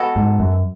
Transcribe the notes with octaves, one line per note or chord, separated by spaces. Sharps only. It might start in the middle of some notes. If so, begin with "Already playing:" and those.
Already playing: G#3 B3 F#4 A4
G#2
F#2